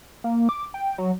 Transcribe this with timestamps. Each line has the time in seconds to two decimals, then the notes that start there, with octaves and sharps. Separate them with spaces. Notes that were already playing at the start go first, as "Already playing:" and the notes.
0.24 A#3
0.49 D6
0.74 G5
0.98 F#3